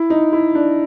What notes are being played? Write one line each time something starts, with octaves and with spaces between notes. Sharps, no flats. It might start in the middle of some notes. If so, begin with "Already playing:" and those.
Already playing: E4
D#4
E4
D4